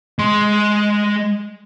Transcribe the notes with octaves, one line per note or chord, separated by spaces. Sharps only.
G#3 C6